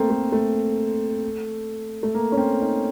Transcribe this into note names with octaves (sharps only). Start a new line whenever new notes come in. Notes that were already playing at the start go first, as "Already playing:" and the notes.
Already playing: A3 A#3 C4
A3
A3
A3
A#3
C#4
C4
D#4